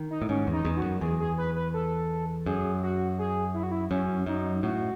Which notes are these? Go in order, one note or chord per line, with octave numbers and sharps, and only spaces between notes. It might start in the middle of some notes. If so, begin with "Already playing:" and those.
Already playing: D#3
D#4
A2
G#2 C#4
E2
D#4
E2
F#4
F#2
E2 G#4
G#4
B4
B4
A4
F#2 G#4
F#4
G#4
E4
F#4
E4
F#2 C#4
F#2 D#4
A2 F#4